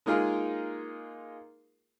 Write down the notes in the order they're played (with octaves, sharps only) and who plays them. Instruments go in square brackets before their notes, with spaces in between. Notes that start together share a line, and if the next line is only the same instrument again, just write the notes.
[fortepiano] G#3 A#3 D#4 F4 G#4 A#4